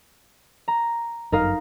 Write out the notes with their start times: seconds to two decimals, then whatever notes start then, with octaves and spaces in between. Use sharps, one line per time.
0.68 A#5
1.32 G1 F#2 D#4 A#4 F5